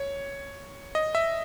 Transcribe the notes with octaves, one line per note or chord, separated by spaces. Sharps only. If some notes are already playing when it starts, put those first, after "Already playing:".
Already playing: C#5
D#5
E5